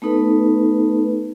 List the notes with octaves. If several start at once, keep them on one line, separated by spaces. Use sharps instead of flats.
A3 B3 D#4 A4 B4